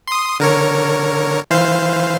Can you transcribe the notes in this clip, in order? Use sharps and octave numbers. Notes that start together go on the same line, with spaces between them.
C6 D#6
D3 A#4 C#5
E3 C5 F5